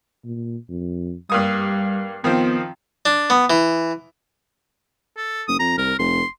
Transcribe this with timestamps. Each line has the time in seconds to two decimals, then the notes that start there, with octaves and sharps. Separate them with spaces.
0.24 A#2
0.69 F2
1.30 G2 G3 A#3 D#6
2.24 D#3 F3 B3 C4
3.06 D4
3.30 B3
3.50 E3
5.17 A4
5.48 F#1 D#6
5.59 F2 A#5
5.77 C2 A#4
5.99 F1 C6